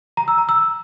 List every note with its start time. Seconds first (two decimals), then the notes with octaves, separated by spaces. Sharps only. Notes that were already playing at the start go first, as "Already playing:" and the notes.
0.17 A#5
0.28 E6
0.38 A#5
0.49 E6